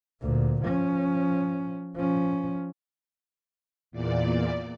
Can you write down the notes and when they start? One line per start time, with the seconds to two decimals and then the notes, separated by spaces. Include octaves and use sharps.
0.21 D2 A#2
0.64 F3 C#4
1.95 F3 C#4
3.91 E2 A#2 D5